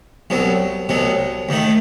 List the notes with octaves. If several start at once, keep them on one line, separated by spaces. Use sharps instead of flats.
C2 B2 F#3
C2 B2 F#3
D#2 D#3 A3